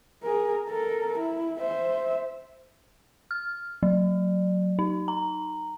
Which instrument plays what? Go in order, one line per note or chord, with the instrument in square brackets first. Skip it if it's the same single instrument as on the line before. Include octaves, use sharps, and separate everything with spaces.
[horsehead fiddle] G#4 A#4
A4 A#4
E4
C5 E5
[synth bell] F6
F#3
D#4
A#5